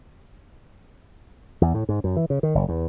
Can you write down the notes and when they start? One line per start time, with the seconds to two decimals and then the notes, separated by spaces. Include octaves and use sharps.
1.61 E2
1.74 A2
1.89 G#2
2.04 F#2
2.16 E3
2.30 C#3
2.43 D#3
2.55 F#1
2.69 E2